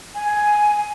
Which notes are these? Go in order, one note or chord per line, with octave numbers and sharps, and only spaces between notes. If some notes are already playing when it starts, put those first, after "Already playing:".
G#5